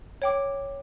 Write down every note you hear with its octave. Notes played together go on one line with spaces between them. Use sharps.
C#5 G5 D6